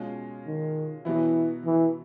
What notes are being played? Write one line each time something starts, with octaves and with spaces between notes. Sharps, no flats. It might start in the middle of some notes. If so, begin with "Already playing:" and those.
Already playing: B2 G#3 C#4 F4
D#3
B2 E3 F#3 B3 E4
E3